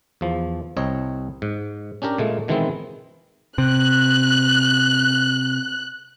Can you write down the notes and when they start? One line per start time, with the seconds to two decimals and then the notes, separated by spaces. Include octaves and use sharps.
0.21 E2 F3
0.77 C2 C4 C#5 D#5
1.42 G#2
2.02 C#4 D4 G4 A#4
2.18 A#2 G#3 A3
2.48 B2 D#3 E3 G#3 B3 C4
3.58 C3 F#6